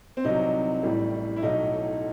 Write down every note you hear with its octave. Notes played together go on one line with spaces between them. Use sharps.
C4
C2 C3 F#3 D#4
A1 A2 E3 G3
E4
B1 A2 F#3 D#4